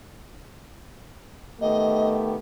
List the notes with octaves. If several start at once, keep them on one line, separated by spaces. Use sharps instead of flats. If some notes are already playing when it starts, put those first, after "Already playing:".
D#3 A3 B3 G4 D#5